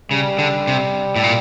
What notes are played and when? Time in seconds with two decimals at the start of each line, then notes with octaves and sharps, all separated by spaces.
0.11 C#3 G3
0.39 D3
0.67 C3
1.16 A2
1.23 A#2